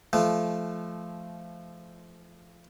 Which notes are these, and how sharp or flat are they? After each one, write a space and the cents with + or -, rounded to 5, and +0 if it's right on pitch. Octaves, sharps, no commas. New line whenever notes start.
F3 -20 A3 -25